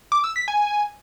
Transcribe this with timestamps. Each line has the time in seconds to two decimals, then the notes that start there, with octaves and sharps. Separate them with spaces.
0.12 D6
0.24 E6
0.36 B6
0.48 G#5